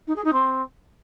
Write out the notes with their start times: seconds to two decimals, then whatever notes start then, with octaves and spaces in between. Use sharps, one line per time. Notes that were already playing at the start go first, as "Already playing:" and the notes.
0.07 D#4
0.16 G#4
0.24 D#4
0.33 C4